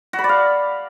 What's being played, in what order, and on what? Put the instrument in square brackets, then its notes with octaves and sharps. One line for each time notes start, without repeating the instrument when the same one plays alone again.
[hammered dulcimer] F#4
B5
D5
F5